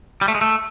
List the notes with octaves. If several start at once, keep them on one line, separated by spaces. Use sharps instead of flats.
G3
A3
G#3
A3